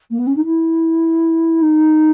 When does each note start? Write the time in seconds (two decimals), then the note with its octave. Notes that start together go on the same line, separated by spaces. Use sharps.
0.10 A#3
0.18 B3
0.27 C#4
0.36 D#4
0.45 E4
1.61 D#4